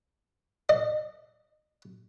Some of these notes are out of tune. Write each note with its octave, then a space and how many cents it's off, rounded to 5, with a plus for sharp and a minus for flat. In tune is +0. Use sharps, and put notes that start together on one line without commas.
D#5 -35